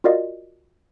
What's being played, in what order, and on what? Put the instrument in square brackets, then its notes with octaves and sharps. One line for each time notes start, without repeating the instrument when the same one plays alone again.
[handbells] F4 F#4 A#4 D5 D#5 F5